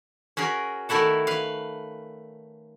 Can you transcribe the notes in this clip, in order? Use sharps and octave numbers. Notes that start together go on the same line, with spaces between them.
C#4 F#4 G#4 A#4
D#3 A3 E4 F#4 A4
B4 F5